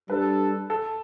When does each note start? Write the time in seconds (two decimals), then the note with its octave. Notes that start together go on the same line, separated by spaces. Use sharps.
0.09 G3 D4 A4 B4
0.70 A4